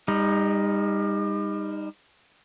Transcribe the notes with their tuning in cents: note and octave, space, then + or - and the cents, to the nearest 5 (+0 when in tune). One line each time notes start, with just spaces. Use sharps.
G3 +35 D#4 +0